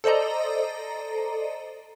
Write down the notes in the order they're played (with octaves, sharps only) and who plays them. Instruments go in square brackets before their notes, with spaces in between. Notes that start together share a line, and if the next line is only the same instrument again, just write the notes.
[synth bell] A4 C5 D5 D#5 A#5